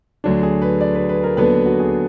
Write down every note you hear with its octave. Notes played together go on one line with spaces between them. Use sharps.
D2 D3 F#3 D4
G#4
B4
D5
B4
B4
A#4
D#2 D3 F#3 B3 D4 B4
F#4
G#4